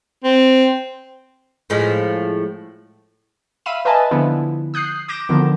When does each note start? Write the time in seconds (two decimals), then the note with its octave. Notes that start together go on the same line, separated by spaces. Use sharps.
0.24 C4
1.70 A2 F3 G#3
3.66 E5 F5 B5 D#7 E7
3.85 B4 D#5 E5 G#5 A5
4.11 D3 F3 B3 E4
4.74 D#6 F#6 G6 C7
5.08 D6 G6 A#6 D7 E7
5.29 D3 D#3 F3 B3